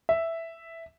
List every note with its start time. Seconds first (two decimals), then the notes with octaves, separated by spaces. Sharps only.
0.09 E5